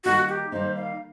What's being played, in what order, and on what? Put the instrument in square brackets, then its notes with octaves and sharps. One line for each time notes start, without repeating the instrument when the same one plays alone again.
[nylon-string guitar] D#3 G3 A#3 D#4 [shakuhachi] F#4
[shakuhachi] G4
[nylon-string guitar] D#3 G3 A#3 D#4 [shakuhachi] C5
[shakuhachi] F5